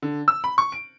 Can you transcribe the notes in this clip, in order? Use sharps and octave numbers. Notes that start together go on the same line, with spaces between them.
D3
E6
B5
C#6
D7